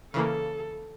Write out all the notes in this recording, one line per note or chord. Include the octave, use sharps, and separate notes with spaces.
C#3 E3 A#3 A4